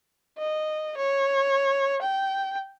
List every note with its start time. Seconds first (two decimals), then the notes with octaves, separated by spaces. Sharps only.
0.38 D#5
0.98 C#5
2.02 G5